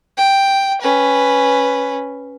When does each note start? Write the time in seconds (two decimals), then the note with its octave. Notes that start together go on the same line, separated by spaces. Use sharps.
0.17 G5
0.81 C#4 B4